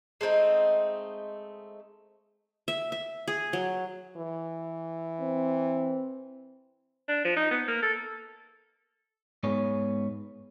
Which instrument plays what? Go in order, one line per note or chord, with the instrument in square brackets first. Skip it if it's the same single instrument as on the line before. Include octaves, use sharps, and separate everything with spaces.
[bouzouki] G#3 A3 C4 D#4
[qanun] E5
E5
G#4
F#3
[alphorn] E3
[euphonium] C4
[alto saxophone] D4
F3
D#4
B3
A#3
A4
[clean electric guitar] G#2 B3 G#4 C#5